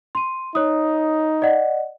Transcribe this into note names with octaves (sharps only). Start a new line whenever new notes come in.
C6 D#7
D#4 C#5 D#6
D5 D#5 F#5